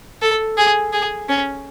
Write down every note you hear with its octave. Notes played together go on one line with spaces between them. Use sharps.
A4
G#4
G#4
C#4